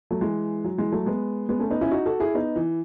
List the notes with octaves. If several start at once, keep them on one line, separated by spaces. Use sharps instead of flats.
F#3 A3
E3 G#3
F#3
E3 G#3
F#3 A3
G#3 B3
G#3 B3
A3 C#4
B3 D#4
C#4 E4
D#4 F#4
F#4 A4
E4 G#4
B3 D#4
E3